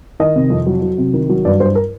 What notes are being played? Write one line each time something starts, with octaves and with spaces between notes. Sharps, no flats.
D#3 D#5
C3
F2
F#3
F#3
C3
D#3
F#3
G2 D5
G2 C5
A#4